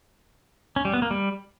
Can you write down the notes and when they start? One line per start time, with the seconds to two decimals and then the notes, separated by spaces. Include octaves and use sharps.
0.76 C#4
0.85 G3
0.94 B3
1.02 A#3
1.11 G3